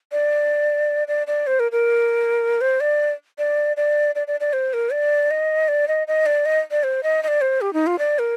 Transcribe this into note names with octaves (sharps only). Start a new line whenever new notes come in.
D5
D5
D5
C5
A#4
A#4
C5
D5
D5
D5
D5
D5
D5
C5
A#4
D5
D#5
D5
D#5
D#5
D5
D#5
D5
C5
D#5
D#5
D5
C5
G4
D#4
F4
D5
A#4